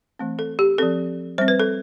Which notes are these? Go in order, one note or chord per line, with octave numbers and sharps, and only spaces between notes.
E3 A3 C4
A4
G4
F3 C4 A4
G3 C4 C5
B4
A4